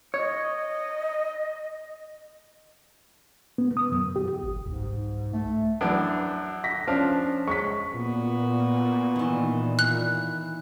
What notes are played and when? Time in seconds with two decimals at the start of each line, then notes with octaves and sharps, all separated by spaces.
0.14 C#5 D#5
3.58 B3
3.77 D#6
3.92 F#2
4.16 G4
4.43 G1
4.66 C2 G#2
5.33 A3
5.81 F#2 E3 D4
6.64 A#6 B6
6.87 F3 C#4 D4 C5 F5
7.48 G#3 C#6 B6
7.94 A#2 B3 F#4
9.16 D#3 E3
9.79 F#6